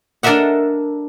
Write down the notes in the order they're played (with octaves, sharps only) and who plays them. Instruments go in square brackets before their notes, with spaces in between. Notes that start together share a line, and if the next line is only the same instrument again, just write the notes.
[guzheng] D4 A4 A#4 D#5 E5 F#5